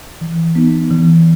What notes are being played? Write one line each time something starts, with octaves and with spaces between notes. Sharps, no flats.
E3
B3 D#4
E3